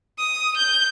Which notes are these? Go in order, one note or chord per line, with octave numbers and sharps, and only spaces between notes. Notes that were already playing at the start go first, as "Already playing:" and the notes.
D#6
G6